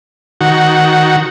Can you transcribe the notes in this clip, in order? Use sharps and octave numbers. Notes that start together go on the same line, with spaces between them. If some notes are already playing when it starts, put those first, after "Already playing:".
D#3 F#4